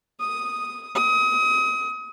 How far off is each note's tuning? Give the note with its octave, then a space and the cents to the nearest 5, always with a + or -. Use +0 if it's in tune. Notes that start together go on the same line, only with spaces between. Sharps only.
D#6 +0
D#6 +30